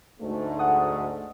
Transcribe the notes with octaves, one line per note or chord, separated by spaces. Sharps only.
D2 G#2 A3
F#5 D#6